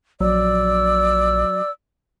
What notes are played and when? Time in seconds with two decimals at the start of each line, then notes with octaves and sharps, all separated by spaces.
0.21 A#1 F#3 D5 E6